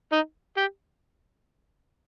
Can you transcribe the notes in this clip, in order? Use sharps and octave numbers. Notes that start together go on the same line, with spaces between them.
D#4
G4